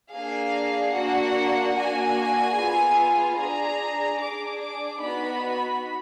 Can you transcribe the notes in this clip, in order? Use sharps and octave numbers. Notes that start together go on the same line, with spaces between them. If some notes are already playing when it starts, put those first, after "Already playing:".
A#3 D4 G#4 F5
A#3 D4 F#4 F#5
A#3 D4 F#4 G#5
B3 F4 G#4
D4 G#4 A#5
D4 G#4 D6
D6
B3 D#4 F#4 B5